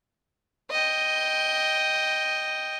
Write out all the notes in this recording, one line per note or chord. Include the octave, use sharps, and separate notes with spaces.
D#5 G5